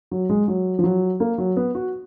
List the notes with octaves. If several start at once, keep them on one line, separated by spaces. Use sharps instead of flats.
F#3
G#3
F#3
F3
F#3
A#3
F#3
B3
F#4